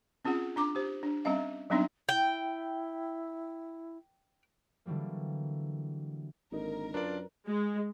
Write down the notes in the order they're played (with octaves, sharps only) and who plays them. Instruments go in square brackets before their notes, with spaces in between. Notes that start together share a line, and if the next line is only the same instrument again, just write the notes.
[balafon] C4 C#4 F4 G#4 F#5
D4 A#5 D6
G4 C5
D4
G3 C4 C#4 D#5 F5
F#3 G3 B3 C4 D4 D#4
[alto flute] E4 [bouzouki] G5
[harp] D3 E3 F#3 G3 A#3
[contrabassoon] G#1 [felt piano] D3 A#3 D#4 [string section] A#4
[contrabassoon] F#2 [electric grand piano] D4 F4 D5 [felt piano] B4
[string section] G#3